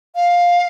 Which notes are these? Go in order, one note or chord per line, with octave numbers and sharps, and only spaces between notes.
F5